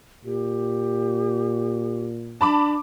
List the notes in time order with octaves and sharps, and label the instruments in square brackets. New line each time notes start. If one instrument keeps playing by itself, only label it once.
[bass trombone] A#2 [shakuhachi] G4
[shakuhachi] D4 [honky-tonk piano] A5 B5 D6